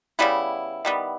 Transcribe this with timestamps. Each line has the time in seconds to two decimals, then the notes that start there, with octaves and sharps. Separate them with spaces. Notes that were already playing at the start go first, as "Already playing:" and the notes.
0.19 C#3 G3 B3 E4
0.85 D#3 G3 B3